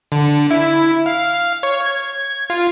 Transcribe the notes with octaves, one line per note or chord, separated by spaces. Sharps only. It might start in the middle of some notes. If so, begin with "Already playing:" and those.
D3
E4
F5
C#5
G#6
F4